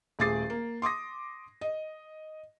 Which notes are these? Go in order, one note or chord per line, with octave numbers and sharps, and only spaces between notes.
D#1 A3 G#4 D6 A6 C7
A#3
C6 D6 D#6 A#6
D#5